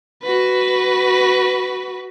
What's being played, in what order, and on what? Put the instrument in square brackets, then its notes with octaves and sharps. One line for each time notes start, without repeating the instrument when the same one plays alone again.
[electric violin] F#4 B4